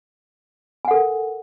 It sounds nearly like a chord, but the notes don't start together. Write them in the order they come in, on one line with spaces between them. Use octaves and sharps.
G#5 F#5 A4 A#4